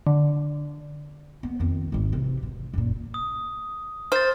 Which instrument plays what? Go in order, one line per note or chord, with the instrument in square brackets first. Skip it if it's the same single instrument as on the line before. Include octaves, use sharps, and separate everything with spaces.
[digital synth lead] D3
[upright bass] B3
F2 D#3
G#1 G#2
C3 E3
G#2
F#2 A#2
[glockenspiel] D#6
[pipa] C5 [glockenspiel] F6 A6